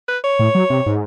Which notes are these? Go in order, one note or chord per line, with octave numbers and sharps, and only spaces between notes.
B4
C#5
A2
F#3
C3
G#2